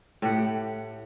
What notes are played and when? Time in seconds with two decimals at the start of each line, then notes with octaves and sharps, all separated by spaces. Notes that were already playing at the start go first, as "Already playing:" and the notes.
0.22 A2 G4 F#5